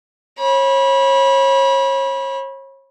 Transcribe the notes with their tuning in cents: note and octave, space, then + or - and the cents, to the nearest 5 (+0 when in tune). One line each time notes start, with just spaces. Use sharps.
C#5 -35 B5 -25